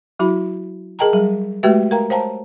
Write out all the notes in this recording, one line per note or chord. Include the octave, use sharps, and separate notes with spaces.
F#3 E4 F#4 B5
G#4 A#4 D#5 G5 A5 A#5
F#3 G3 G#4
G#3 A3 F#4 G4 B4 E5
A#4 F5 G5 A#5
C5 C#5 F5 G5 A5 A#5